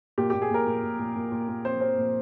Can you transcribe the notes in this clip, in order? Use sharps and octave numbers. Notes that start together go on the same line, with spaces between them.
A#2 G4
G4
A#2
G#4
A#2 A#4
A#2
A#2
A#2
A#2
A#2
A#2
C4 C5
C4
A#2